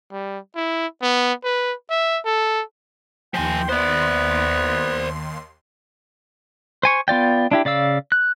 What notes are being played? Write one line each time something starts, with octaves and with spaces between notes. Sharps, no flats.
G3
E4
B3
B4
E5
A4
D#2 F3 G5 G#5 C6
B3 C5 D5
C5 G#5 C#6
B3 F4 D5 G5
D4 E4 G4
C#3 D5 F5 E6
F#6